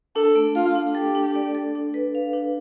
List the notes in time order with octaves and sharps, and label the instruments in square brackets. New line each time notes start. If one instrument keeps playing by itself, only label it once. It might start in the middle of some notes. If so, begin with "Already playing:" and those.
[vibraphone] D4 [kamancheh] A4
[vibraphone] A3
[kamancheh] F4 [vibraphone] A4
[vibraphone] D4
[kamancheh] G4 [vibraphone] A4
[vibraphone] D4
D5
A4
D4
B4
F5
D4